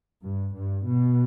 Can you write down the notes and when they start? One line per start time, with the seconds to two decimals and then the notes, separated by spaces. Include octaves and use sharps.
0.23 G2
0.53 G2
0.85 B2